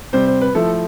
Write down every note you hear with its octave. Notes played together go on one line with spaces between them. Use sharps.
C3 G3 C4 C5
C5
B4
F3 A3 E4 A4